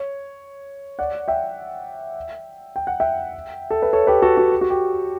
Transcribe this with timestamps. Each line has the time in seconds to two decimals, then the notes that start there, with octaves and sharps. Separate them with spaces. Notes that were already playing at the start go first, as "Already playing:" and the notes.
Already playing: C#5
0.99 D5 F#5
1.28 E5 G5
2.76 G5
2.87 F#5
3.00 E5 G5
3.71 A4
3.82 B4
3.93 A4 C#5
4.07 G4 B4
4.22 F#4 A4
4.37 F#4
4.52 G4
4.61 F#4
4.70 G4